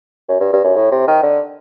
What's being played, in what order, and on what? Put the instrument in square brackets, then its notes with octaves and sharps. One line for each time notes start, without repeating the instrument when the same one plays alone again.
[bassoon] F#2
G2
G2
F#2
A2
C3
D#3
D3